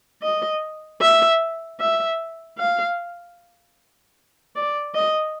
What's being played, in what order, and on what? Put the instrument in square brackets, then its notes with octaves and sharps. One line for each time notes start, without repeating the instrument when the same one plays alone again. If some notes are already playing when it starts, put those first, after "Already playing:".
[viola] D#5
E5
E5
F5
D5
D#5